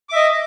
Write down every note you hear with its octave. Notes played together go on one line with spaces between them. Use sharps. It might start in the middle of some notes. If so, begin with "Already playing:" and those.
D#5 E5 D6